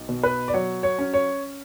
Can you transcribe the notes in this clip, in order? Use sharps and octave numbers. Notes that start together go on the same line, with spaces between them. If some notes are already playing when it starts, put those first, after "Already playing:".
Already playing: B1
B2
B4
D5
F#3 C#5
C#5
C#4
C#5